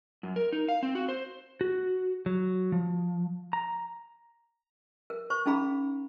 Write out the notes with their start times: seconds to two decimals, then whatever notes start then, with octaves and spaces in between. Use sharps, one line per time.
0.23 F#2
0.36 A#4
0.52 D#4
0.69 F5
0.83 C4
0.95 F#4
1.09 C5
1.61 F#4
2.26 F#3
2.72 F3
3.53 A#5
5.10 A#4
5.30 C5 C#6
5.46 C#4 D#4 G#4 F5 A#5 B5